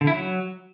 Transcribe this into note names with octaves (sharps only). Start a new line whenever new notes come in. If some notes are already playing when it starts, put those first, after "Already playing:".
D3
E4
F#3